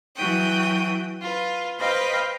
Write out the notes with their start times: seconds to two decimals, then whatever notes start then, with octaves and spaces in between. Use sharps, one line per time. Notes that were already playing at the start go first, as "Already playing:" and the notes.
0.15 E3 F#3 F#4 G5 D#6
1.21 F4 B4
1.79 B4 C5 D#5 F5 G5 B5